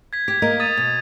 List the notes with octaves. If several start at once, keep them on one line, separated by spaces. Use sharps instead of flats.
G#6 B6
G4 G#6 B6
A#3 A#4 D#5
D#6 A6 D#7
B2